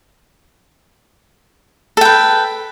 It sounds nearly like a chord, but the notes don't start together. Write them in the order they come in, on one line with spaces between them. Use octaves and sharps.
A4 G5 B4